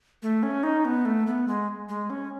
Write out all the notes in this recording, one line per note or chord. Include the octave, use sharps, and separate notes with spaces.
A3
C#4
D#4
B3
A3
B3
G#3
G#3
C#4